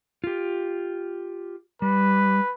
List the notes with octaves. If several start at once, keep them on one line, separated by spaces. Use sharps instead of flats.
F4 G4
G3 B4